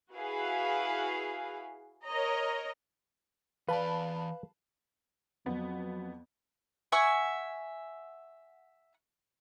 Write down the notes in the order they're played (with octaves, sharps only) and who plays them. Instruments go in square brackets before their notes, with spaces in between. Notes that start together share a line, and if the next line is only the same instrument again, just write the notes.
[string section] E4 F#4 G#4 B4 F5
A#4 C#5 D#5 A#5
[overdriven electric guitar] E3 D5 [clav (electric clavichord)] B4 [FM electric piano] F5 A5 B5
[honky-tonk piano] F2 B3 [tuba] F#3
[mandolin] E5 F#5 G#5 C#6